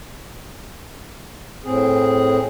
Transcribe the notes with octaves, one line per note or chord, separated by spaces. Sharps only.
A2 C4 G#4